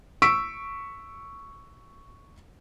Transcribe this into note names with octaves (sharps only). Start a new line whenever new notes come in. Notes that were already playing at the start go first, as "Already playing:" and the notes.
C#6 E6 B6 D7